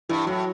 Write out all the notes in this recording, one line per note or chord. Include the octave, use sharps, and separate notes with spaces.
G2 E3
A2 F#3